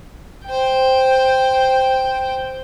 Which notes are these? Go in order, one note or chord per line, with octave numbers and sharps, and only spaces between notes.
C5 G5